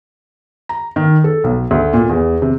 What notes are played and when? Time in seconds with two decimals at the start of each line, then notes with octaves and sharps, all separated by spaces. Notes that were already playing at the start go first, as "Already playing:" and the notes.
0.69 A#5
0.96 D#3
1.24 A4
1.44 B1
1.71 D2
1.93 A#2
2.09 E2
2.42 C3